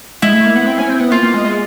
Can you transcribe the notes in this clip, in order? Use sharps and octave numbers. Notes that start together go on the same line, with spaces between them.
G#3 E4
A3
A#3
B3
C4
C#4
C4
B3
A#3 F4
A#3
G#3
G#3